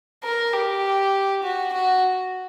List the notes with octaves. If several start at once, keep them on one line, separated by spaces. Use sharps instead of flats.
A#4
G4
F#4
F#4